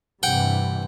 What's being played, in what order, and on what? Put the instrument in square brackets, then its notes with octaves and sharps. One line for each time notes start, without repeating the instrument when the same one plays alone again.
[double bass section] G2 C3 E3 [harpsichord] F#5 G5